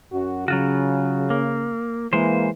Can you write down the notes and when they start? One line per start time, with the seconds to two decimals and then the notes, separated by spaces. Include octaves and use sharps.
0.12 F#2 F#4
0.48 C#3 F#3 F4 F#4
1.30 A#3
2.13 E3 G#3 A#3 C5